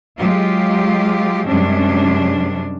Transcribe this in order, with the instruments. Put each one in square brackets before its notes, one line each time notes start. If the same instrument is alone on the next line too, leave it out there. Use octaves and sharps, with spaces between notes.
[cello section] F#3 G#3 F4 G4
F#2 C3 G3 G#3 C#4 D4